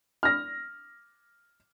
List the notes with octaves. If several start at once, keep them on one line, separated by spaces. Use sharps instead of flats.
F6 A#6